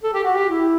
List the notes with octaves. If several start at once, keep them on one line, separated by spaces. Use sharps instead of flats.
A4
G4
F#4
G4
E4